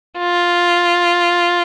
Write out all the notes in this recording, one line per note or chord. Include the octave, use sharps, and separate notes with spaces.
F4